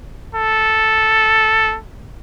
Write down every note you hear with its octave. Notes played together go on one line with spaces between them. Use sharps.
A4